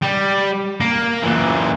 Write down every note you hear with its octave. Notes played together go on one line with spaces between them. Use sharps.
G3
A#3
A#2 E3